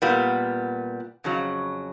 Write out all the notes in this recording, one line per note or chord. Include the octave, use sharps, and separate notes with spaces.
A#2 G3 B3
F2 C#3 F#3